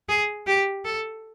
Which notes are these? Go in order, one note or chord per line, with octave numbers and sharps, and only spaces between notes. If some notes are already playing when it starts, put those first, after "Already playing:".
G#4
G4
A4